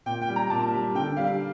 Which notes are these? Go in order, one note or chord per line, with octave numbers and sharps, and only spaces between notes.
A#2 G5
G5
G3
A#5
A#2 A5
G3
D3 G5
G3 F5